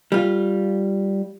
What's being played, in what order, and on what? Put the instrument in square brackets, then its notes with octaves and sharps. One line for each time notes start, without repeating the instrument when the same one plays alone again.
[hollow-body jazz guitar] G3 F4